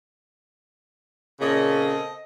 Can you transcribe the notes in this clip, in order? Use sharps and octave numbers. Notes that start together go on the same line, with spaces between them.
A#2 C#3 C4 A4 D#5